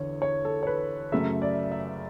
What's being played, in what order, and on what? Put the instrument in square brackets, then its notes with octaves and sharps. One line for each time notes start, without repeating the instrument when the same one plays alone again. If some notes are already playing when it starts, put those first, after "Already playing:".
Already playing: [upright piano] E2 D3 C#5
C#5
A4
C#5
B4
F#2 C#3 F#3 A3 E5
D5
E5